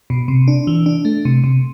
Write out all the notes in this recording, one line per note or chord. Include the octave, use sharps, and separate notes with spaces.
B2
C3
D4
E3
D4
A3
C3
C3